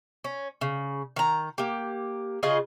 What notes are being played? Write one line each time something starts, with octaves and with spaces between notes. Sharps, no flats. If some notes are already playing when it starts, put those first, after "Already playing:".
C#4
C#3
D#3 A#5
A#3 G4
C#3 F4 G#4 D#5